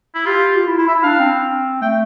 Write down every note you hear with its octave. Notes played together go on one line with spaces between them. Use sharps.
E4
F4 G4
F4
E4
E4
E4 E5
D4 F5
C4
A3 G5